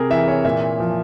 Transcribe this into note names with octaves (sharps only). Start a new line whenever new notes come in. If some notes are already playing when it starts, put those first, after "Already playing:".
Already playing: C3 G#4 A#4
E3 E5
C#5
A#2 E5
F3